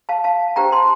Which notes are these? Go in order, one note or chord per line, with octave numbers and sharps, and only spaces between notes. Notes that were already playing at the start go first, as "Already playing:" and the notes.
F5 A5
F5 A5
D4 G4 C5 G5 A#5
A5 C6